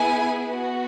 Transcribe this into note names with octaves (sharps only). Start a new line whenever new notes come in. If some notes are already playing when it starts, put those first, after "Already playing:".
Already playing: B3 E4 G#4 G#5
B3
F#4